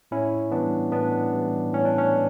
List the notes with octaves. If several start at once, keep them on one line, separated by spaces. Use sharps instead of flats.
A2 C#4 E4
E3 G3 B3 D4
A2 B3 D4
E3 G3
A2 C#4
D4
C#4
E3